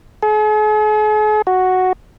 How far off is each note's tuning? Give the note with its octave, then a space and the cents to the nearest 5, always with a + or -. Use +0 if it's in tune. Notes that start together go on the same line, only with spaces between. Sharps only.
G#4 +45
F#4 +0